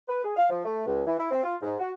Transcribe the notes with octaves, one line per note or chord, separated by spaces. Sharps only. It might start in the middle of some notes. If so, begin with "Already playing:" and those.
B4
G#4
F5
F3
A3
C#2
E3
E4
C4
F4
G#2
F#4